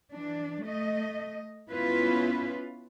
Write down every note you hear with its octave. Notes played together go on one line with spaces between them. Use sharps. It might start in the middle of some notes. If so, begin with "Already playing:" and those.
E3 D4
A3 D#5
B3 C#4 E4 F4 B4